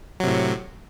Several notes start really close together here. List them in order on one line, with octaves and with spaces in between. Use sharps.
F#3 C3 A2